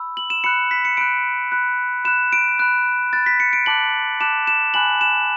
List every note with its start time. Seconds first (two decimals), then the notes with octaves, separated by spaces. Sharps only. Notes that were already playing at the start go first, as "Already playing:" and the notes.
Already playing: B5 E6
0.17 F#7
0.30 E7
0.44 B5 F#6 C#7
0.71 B6
0.85 C#7
0.97 B5 F#6 D7
1.52 B5 F#6
2.05 B5 F#6 E7
2.33 D7
2.59 B5 F#6
3.13 B5 F#6 A6
3.26 B6
3.40 C#7
3.53 D7
3.66 A5 D6 F#6 F#7
4.21 A5 D6 F#6 E7
4.47 E7
4.74 G#5 B5 F#6 F#7
5.01 E7